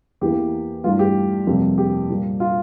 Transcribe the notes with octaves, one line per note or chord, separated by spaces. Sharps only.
E2 E3 A#3 G4
G2 E3 A3 F4
G4
F2 C3 G3 A#3
G4
A#2 G3 A#3
F4